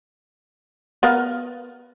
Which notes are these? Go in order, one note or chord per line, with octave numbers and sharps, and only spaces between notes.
B3 A#4 F5